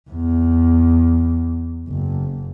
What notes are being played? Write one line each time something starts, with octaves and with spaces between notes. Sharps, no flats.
E2
F#1